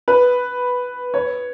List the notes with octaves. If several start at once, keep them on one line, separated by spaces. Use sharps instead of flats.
B4
C#5